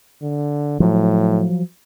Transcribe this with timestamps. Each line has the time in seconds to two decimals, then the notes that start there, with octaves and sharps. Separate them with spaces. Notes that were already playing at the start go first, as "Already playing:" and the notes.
0.22 D3
0.80 A2 F3 F#3